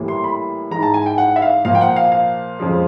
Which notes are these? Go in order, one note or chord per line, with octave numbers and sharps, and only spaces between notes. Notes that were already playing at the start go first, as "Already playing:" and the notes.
Already playing: A2 E3 G3 A#3
C6
B5
G#2 E3 G#3 A#5
A5
G#5
G5
F#5
E5
F5
A#2 F3 A#3 F5
G5
F#5
F5
F5
F2 C#3 F3 G#3